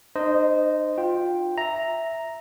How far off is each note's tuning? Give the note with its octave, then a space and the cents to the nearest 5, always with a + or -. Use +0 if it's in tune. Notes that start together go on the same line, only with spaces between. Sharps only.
D#4 -45 C5 -15 D#5 -10
F4 +15 G5 +0
E5 +0 A#5 +0